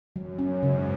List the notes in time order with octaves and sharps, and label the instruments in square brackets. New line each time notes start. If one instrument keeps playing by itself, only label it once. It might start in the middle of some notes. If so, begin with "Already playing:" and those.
[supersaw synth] F#2 [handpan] F#3
[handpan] C#4
[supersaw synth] G#2
[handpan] C#3